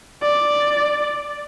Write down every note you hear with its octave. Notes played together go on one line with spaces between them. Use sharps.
D5